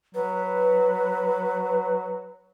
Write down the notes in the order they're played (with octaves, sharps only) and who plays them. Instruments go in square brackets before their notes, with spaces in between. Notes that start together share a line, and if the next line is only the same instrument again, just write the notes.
[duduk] F#3 [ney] B4